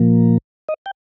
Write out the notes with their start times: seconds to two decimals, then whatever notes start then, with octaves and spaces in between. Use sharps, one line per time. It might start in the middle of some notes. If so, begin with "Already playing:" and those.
Already playing: A#2 F3 A#3
0.69 D#5
0.86 G5